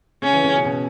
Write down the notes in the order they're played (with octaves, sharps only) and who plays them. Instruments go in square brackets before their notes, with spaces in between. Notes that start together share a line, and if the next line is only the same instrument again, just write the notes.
[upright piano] C#3 [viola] C#4
[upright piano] E3
C#3
B2
B2